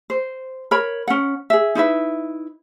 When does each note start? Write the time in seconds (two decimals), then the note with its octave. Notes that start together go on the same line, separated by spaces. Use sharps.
0.10 C5
0.71 A#4 C#5 B5
1.08 C#4 F#5
1.50 G#4 E5
1.75 D#4 E4 B4 E5